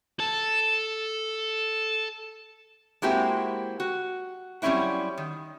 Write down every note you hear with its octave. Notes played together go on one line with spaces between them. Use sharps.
A4 A5
G#3 A#3 C4 E4 F#4 G4
F#4
F#3 G3 C4 C#4 E4 F#4
D#3